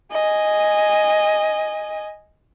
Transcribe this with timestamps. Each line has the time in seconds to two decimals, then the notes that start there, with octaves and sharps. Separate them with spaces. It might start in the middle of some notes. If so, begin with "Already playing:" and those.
0.11 D#5 G#5